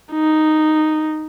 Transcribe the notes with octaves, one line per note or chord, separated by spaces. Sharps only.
D#4